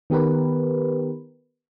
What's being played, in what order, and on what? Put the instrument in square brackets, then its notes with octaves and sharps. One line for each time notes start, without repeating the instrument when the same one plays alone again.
[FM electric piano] D#3 B3 G4 A#4 B4